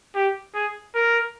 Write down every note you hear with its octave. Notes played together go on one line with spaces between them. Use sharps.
G4
G#4
A#4